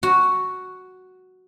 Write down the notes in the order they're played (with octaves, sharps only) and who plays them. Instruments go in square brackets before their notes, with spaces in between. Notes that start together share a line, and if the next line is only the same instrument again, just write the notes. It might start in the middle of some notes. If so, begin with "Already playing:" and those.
[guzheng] F#4